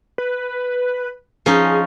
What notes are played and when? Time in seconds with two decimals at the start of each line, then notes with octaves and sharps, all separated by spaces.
0.18 B4
1.46 F3 C#4 D#4 G#4